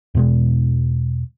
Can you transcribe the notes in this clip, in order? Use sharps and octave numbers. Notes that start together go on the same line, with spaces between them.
E2 B2 G#3